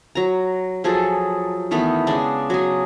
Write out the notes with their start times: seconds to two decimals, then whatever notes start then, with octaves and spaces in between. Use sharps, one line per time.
0.15 F#3 A#5
0.84 F3 F#3 G#4 A4
1.71 D#3 E3 A3 B3
2.07 C#3 G#3 D4
2.50 F#3 G#4